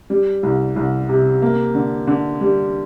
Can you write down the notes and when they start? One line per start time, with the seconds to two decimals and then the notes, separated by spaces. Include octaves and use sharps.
0.10 G3
0.43 C2
0.76 C2
1.09 C3
1.42 A#3
1.75 D3
2.07 D3
2.41 G3